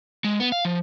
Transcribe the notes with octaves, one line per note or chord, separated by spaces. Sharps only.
G#3
B3
F5
F3